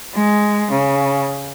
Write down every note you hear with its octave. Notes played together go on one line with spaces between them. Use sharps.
G#3
C#3